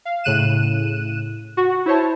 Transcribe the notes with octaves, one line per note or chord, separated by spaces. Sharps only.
F5
A2 C#3 F#6 D#7 E7
F#4
E4 C5 C#5 A5